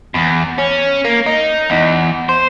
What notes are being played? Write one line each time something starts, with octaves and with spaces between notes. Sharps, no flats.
E2
C#4
A#3
D#4
E2
C5